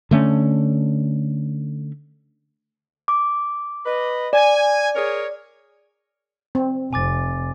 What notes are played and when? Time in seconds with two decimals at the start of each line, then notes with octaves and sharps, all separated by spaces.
0.11 D3 A3 C#4
3.08 D6
3.86 B4 D#5
4.33 D5 G#5
4.95 G#4 A#4 C#5
6.55 C4
6.93 F1 G#5 D6 A6